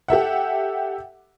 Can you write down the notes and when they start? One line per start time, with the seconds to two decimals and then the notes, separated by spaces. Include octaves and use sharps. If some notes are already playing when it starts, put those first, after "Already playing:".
0.08 G4 A4 E5 F#5